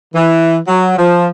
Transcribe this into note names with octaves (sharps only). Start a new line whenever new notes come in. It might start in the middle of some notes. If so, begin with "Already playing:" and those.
E3
F#3
F3